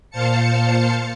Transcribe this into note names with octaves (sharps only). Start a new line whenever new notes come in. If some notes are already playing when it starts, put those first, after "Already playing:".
A#2 C5 F5 A5 C#7